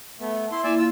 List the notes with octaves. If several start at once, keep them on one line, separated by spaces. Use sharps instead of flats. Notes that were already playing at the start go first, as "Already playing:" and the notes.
A3 B3
E4 C6
A#3 E4 D5 E5 G#5
F4 E6